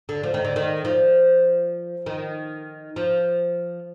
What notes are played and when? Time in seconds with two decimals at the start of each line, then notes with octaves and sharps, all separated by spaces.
0.09 D3
0.23 F3
0.34 D#3
0.45 D3
0.56 D#3
0.85 F3
2.06 D#3
2.96 F3